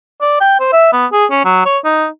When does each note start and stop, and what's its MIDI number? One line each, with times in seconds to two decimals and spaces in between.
0.21 0.36 74
0.40 0.59 79
0.60 0.69 72
0.72 0.89 76
0.93 1.06 59
1.13 1.25 68
1.31 1.40 61
1.45 1.65 54
1.65 1.78 73
1.85 2.06 63